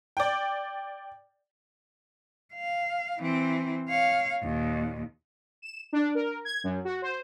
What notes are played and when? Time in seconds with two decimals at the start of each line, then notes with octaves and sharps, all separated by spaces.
0.17 D5 G5
2.54 F5
3.19 E3 C4
3.90 C#5 F5
4.43 D#2 A#2
5.62 E7
5.93 D4
6.15 A#4
6.45 G#6
6.64 F#2
6.85 F#4
7.02 C5